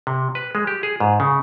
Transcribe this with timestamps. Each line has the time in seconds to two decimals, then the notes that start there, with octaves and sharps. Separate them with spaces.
0.07 C3
0.35 B4
0.55 G#3
0.67 G4
0.83 G#4
1.00 G#2
1.20 C#3